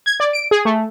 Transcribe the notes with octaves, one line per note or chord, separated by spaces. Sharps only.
G#6
D5
D7
G#4
A3